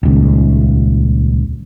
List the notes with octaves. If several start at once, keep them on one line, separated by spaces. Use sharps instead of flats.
D#1 C#2